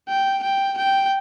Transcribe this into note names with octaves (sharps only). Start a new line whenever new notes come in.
G5
G5
G5